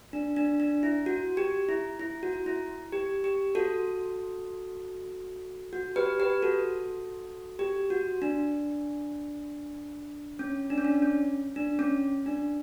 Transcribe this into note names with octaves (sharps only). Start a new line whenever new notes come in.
D4
D4
D4
E4
F#4
G4
E4
E4
F#4
E4
G4
G4
F#4 A4
F#4
G4 B4
G4 B4
F#4 A4
G4
F#4
D4
C#4
D4
C#4
D4
C#4
D4
C#4
D4